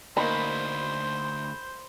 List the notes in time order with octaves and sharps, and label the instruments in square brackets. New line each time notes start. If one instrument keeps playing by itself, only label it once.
[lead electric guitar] D2 [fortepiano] A#3 D#4 [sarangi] C5 [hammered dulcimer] B5